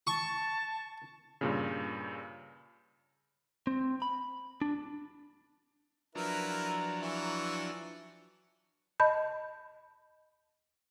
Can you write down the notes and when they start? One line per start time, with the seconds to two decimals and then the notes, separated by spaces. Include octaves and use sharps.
0.07 A5 C#6
1.41 G2 A#2 C#3
3.67 C4
4.02 B5
4.62 D4
6.15 F3 F#3 D4 E4 A#4 B4 A#5
7.02 E3 E5 C#6
9.00 D#5 A5 B5 G6